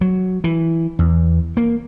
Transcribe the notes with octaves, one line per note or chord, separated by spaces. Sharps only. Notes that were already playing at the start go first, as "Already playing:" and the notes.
F#3
E3
E2
A#3